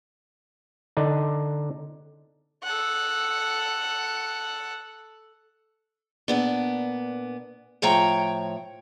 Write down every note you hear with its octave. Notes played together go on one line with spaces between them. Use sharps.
D3 D4 D#4
A4 F#5
A#2 B3 D4
A2 F3 C#5 G5 A#5